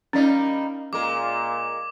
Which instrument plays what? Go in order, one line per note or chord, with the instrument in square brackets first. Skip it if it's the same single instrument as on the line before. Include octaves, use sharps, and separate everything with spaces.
[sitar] G3 A#3 D#4 [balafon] C#4 D5
[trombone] A#2 [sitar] G#3 A#4 [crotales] D6